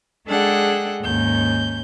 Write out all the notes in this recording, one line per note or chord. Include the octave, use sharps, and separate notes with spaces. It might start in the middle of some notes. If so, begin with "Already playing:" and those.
G#3 D4 G#4 A4 F#5 G5
D#2 G#2 C#4 G6